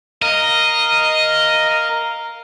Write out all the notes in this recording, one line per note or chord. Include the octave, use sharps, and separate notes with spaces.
A#4 D#5 F5 A#5